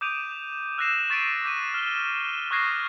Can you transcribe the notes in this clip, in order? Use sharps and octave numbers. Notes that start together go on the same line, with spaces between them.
D6 D#6 G6 D7 D#7 F7
E6 F#6 G6 A#6 C7 E7
C#6 A6 B6 D7 D#7
D6 G6 A#6 D#7
F6 G7
C#6 D#6 F#6 G#6 A#6 C7